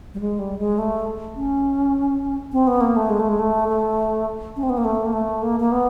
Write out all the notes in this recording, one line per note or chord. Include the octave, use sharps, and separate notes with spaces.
G3
G#3
G3
G#3
A3
C#4
C4
B3
A#3
A3
G#3
A3
G#3
A3
A3
C#4
C4
B3
A#3
A3
A#3
A3
A#3
A#3
B3